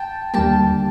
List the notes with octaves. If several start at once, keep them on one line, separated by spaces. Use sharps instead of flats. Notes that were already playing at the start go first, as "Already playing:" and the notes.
Already playing: G5 A5
D#2 D3 G3 A#3 G5 A5